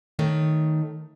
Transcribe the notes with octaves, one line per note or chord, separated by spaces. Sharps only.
D#3 A3 C#5